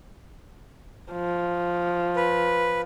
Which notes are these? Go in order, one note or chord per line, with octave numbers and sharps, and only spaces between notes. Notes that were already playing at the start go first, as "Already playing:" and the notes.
F3
B4